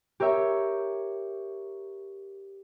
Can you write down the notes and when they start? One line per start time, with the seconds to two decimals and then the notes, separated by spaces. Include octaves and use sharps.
0.20 G4 A#4 C#5 E5